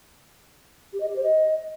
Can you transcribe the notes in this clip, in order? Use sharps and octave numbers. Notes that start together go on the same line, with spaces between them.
G4
D#5
G4
C5
D#5